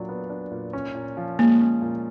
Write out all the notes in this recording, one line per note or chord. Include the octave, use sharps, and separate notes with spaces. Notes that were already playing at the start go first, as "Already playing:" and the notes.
Already playing: A#2 F#3 D4
B3
D4
A#2
C#4
A#2
F3
G#3 A#3
C#4
A#2